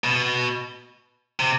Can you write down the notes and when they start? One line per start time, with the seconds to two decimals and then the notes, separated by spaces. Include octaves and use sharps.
0.04 B2
1.40 C3